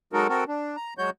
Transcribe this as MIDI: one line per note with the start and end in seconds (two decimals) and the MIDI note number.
0.13 0.28 54
0.13 0.28 56
0.13 0.28 63
0.13 0.28 66
0.13 0.28 69
0.13 0.28 70
0.29 0.44 60
0.29 0.44 66
0.29 0.44 69
0.29 0.44 70
0.48 0.76 62
0.76 0.94 82
0.98 1.10 54
0.98 1.10 56
0.98 1.10 66
0.98 1.10 73
0.98 1.10 91